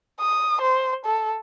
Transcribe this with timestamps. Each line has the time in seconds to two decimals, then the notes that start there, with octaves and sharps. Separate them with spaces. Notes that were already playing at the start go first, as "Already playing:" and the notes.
0.20 D#6
0.61 C5
1.05 A4